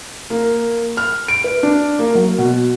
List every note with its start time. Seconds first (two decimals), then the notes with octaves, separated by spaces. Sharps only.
0.30 A#3
0.97 F6
1.28 D7
1.44 B4
1.63 D4
1.99 A#3
2.15 F#3
2.38 B2